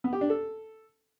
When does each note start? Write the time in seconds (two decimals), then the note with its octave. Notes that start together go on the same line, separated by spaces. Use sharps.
0.04 B3
0.13 G4
0.21 D4
0.30 A4